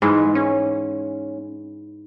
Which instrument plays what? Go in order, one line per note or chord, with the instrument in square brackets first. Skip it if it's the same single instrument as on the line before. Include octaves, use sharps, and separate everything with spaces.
[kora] G#2 E3 [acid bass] G#3
[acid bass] C#4